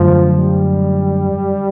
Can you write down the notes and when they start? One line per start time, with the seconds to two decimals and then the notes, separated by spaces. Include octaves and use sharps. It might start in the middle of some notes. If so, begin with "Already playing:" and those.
Already playing: F#2 D3 F3 F#3 A3
0.38 G3